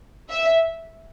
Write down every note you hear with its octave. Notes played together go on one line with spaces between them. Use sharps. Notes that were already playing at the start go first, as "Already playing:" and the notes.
E5